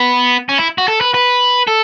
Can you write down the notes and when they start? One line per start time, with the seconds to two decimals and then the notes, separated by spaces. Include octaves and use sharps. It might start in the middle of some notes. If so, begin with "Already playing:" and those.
Already playing: B3
0.49 C#4
0.58 E4
0.78 F#4
0.88 A4
1.01 B4
1.14 B4
1.67 A4